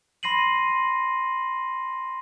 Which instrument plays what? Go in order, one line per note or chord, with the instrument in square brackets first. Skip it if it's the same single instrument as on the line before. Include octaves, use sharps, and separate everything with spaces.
[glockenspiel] B5 C6 A#6 C7 D#7 F#7